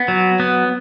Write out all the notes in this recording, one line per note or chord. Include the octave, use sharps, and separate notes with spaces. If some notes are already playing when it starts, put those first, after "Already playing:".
Already playing: B3
F#3
B3